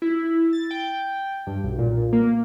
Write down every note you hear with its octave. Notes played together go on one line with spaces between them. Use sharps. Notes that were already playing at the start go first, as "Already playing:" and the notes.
E4
A6
G5
G2
B1
A#2
A#3